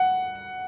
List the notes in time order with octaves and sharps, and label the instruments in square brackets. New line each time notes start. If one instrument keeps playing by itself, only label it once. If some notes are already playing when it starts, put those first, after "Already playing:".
Already playing: [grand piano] F#5